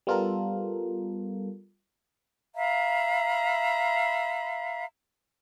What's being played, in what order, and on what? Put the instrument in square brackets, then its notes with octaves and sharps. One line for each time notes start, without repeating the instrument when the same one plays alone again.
[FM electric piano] G3 B3 F4 A4 A#4
[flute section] E5 F5 A#5 B5